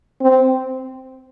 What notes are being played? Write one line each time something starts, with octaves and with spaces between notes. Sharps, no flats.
C4